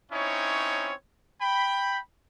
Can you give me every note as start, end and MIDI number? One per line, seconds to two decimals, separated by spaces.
0.12 0.93 60
0.12 0.93 61
0.12 0.93 63
0.12 0.93 64
0.12 0.93 73
1.41 1.98 79
1.41 1.98 83